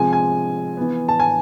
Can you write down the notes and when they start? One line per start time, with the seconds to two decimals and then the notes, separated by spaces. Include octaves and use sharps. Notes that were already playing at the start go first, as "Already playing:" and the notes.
Already playing: C3 F3 G#3 C4 G#5
0.13 G#5
0.77 E3 B3
1.09 A5
1.20 G#5